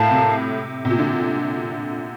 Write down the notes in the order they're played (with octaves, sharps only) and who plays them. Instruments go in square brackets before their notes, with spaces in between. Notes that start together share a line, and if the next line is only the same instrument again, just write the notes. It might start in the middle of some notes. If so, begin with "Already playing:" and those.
Already playing: [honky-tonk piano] A2 [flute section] A#4 F5 A5
[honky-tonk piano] C3
C3
A#2
D3